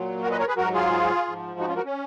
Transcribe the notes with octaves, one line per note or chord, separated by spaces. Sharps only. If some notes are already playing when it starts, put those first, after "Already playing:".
Already playing: A#2 F#3
F#4 A#4
B4 D#5
A#4 C#5
G#4 B4
G#2 F#3 F#4 A#4
F4 G#4
G#2 F3
D#4 F#4
C#4 F4
F#4 A#4
C#4